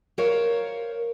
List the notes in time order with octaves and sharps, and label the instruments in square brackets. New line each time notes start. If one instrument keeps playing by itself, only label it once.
[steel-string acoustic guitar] A#4 C5 C#5 F5